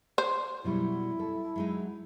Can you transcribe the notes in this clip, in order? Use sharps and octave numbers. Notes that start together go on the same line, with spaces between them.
C5
B2 F#3 G3 E4
A4
F#3 G#3 D#4